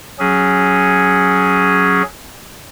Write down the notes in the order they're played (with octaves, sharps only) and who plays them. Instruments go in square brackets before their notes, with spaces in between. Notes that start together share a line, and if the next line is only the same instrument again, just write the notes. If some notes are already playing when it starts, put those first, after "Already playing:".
[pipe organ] F#3 C#4 G#4